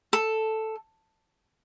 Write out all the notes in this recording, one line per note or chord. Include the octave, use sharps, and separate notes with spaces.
A4